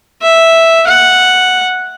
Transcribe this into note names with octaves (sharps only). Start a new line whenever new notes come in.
E5
F#5